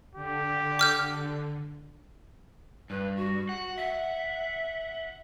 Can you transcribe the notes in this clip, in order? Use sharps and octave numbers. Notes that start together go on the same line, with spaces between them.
D3 G4
D6 F6 G6
G2 B4
F#4
F#5
E5